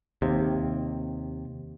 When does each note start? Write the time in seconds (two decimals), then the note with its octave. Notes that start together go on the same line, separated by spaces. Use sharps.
0.22 D#2 C3